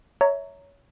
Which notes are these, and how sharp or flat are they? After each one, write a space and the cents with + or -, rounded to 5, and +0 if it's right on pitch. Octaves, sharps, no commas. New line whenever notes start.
C#5 +15 E5 -15 A#5 -10